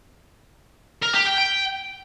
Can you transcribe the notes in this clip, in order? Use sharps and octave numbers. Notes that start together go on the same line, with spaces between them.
A#4
G4
G5
G5